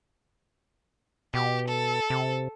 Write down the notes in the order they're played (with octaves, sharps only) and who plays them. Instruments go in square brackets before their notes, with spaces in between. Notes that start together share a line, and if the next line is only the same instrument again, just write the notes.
[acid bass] B2 [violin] G4
[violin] A4
[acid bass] C3